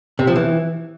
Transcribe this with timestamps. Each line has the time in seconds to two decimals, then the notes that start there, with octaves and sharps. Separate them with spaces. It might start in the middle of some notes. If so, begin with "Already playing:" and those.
0.19 C3
0.27 F3
0.36 E3